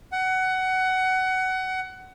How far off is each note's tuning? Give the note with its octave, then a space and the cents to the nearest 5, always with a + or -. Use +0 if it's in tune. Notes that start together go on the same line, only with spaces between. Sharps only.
F#5 +20